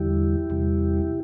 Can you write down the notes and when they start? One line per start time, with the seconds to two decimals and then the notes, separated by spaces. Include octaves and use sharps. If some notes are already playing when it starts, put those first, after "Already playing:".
Already playing: E2 D3 G3 E4 G4
0.50 E2 C3 G3